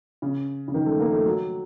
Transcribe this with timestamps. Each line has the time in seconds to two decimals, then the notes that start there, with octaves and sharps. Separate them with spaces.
0.22 C#3
0.68 C#3
0.74 D#3
0.86 A3
1.00 A#3
1.13 A3
1.25 F#3